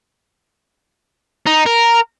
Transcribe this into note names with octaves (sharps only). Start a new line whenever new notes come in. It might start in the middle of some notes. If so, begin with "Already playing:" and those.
D#4
A#4